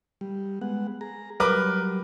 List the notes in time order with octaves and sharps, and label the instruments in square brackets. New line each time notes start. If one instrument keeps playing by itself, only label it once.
[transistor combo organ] G3
G#3 B3 F#5
G#4 A#5
[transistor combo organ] F#3 G3 [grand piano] A#4 B4 D6